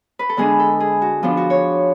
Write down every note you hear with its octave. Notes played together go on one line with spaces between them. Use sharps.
B4
A4
D3 G#3 B3 D4 G#4
A4
G#4
F#4
F3 B3 D4 F4
F#4
C#5